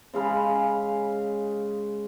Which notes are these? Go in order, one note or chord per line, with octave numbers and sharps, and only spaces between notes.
C#3 G#3 F5 B5